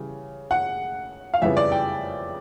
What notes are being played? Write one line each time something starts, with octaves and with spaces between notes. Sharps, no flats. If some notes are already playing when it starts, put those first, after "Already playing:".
Already playing: C#3 E3 G3
F#5
F5
F2 C#3 E3 G3 B3 E5
D5
G5